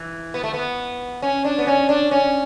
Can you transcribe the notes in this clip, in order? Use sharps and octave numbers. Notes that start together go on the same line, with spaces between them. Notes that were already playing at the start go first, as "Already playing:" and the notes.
Already playing: E3
B3
A3
B3
C#4
D4
B3
C#4
D4
C#4